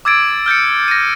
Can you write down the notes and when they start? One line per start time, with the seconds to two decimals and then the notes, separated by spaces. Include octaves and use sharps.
0.05 D6 E6 G#6 A6 D7
0.46 F6 G6 A6 C#7
0.88 A#6 D#7